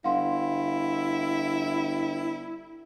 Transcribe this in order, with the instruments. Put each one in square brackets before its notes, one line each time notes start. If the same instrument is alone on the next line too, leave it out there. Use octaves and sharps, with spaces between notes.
[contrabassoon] G1 [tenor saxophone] E4 [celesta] F5 F#5 C6